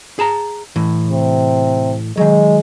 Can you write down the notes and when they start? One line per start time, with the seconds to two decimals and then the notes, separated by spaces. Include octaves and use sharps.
0.19 G#4 A5 A#5
0.76 A2 E3
1.10 C3
2.17 D#3 F#3 G#3